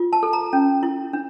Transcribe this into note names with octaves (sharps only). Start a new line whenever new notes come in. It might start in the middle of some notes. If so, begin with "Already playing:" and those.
Already playing: F4
A5
A4
A#5
C#4
E4
D4